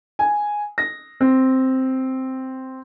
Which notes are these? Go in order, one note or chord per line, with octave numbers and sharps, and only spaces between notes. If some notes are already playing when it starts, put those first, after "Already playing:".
G#5
A#6
C4